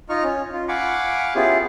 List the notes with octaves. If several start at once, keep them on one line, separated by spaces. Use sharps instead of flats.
D#4 F4 D#5 A#5 C#6 F6
C#4
F4
F5 F#5 G#5 B5 C#6 D6
B3 C#4 E4 F4 G4 G#4